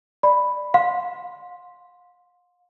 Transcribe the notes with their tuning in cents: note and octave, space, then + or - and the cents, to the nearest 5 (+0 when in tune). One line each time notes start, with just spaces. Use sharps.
D5 +10 B5 +0
F5 +40 C6 +0